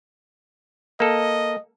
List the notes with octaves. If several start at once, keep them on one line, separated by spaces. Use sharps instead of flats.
A#3 A4 D#5